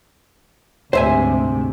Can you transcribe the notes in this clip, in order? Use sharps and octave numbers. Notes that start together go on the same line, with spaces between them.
D2 G#2 C3 C5 E5 G#5